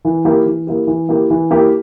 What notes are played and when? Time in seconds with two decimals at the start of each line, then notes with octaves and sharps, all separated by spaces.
0.05 E3
0.25 A#3 E4 G4
0.46 E3
0.67 A#3 E4 G4
0.87 E3
1.09 A#3 E4 G4
1.30 E3
1.51 A#3 E4 G4